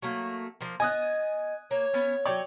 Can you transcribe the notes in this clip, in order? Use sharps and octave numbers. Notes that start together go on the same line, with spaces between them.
F#3 A3 A#3
F3 A#3
B3 D#5 G#5 D#6 F#6
A#3 C#5
B3 C#4
F#3 C#5 D5 G5